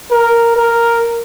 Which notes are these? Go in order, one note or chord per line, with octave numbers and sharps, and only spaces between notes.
A#4
A#4